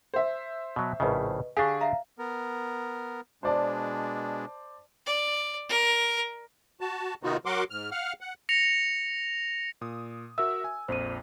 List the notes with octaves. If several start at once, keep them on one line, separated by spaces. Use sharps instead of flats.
C5 E5
B2 F#3
A#1 A2 C#3 B4 D#5
D3 D4 G4 G#4 F5 C#6
E5 F5 A#5
B3 A#4
B2 G#3 D4 C5 D5 A5
D5
A#4
F#4 A5
C3 D#3 B3 D#4 F4 F#4
F#3 F#4 A#4 F#5 C6 D6
G#2 F6
F5 F#5 F6
F#5
A#6 C#7 F7
A#2 D#6
F#4 A#4 E5 E6
G#5
A#1 F2 C5 D#7